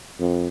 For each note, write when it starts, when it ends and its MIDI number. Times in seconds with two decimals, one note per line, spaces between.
0.20 0.48 41